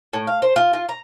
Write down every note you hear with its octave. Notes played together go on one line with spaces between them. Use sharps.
A2
F5
C5
F4
F4
A#5